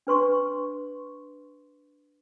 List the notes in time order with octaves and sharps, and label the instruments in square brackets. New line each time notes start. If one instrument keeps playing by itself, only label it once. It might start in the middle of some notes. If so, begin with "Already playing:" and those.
[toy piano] D4 B4 C6 C#6